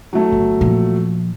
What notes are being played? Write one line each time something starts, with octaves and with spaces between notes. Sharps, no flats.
F#3 A3
G1
A#2 F3